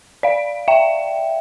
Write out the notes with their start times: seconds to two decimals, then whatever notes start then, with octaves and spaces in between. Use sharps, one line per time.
0.23 D5 F5
0.68 E5 G5